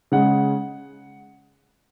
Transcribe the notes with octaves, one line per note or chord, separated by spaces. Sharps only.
C#3 G#3 F#5